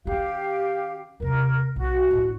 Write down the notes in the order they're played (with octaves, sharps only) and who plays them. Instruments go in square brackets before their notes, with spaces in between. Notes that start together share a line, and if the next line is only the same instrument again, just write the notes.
[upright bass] D#3 C#4 [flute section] G4 F5
[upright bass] D#2 C3 [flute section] A#4
[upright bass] B1 [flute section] F#4
[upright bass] A1 D3